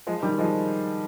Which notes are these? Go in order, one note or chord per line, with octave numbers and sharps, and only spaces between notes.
F3 G#3
D#3 G3
F3 G#3